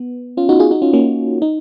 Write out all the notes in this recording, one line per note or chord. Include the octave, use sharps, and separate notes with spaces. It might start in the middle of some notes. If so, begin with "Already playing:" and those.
Already playing: B3
C#4 F4
D#4 F#4
F4 G#4
D#4 F#4
C#4 F4
A#3 C#4
D#4